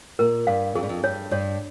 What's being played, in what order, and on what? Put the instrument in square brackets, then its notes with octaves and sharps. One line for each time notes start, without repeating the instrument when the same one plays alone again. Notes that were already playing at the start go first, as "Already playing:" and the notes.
[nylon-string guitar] A#2 [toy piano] A#4
[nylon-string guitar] G2 [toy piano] F5
[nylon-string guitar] F2 [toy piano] G#4
[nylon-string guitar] G2
F2
[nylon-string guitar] G2 [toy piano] C#5
[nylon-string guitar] G2 [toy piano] C#5